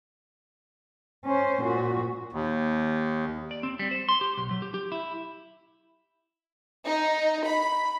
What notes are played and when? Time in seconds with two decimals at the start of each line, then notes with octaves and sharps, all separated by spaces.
1.25 C#4 C5
1.62 A#2 F#4
2.33 D#2
3.51 D5
3.63 C4
3.79 G3
3.91 C5
4.09 C6
4.21 G4
4.37 B1
4.51 F#3
4.62 G4
4.74 G4
4.92 E4
6.85 D#4
7.46 B5